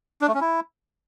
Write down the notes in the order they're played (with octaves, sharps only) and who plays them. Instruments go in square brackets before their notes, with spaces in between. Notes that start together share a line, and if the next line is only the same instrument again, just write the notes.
[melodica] D4
A3
C#4
E4